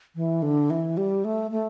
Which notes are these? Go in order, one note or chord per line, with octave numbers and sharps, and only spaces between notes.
E3
D3
E3
G3
A3
A3